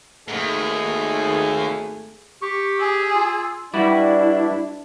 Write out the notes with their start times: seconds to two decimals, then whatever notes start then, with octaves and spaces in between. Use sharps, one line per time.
0.28 G#1 D#2 G#2 A3 G#4
2.42 G4 C#6
2.79 G#4 E6
3.14 F4
3.74 G3 D4 E4 F#4 B4 D5